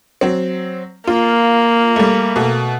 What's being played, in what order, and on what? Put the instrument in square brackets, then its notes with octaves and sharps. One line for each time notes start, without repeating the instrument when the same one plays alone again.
[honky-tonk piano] F#3 C4
[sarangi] A#3 [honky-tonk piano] F4
[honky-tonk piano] G3 A3
B2 A3